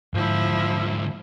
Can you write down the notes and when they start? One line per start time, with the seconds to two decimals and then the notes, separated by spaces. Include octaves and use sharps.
0.14 G#2 D3 F3 E4